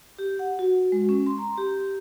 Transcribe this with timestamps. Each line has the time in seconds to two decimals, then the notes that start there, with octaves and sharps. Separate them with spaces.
0.19 G4
0.39 F#5
0.59 F#4
0.92 G#3
1.09 C#4
1.26 C6
1.38 A#5
1.58 G4